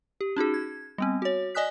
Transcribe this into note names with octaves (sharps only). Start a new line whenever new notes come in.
G4
C#4 D#4 F#4 G#4
G#6
G3 B3 C4
F#4 C#5
D5 D#5 G#5 D#6 F#6 B6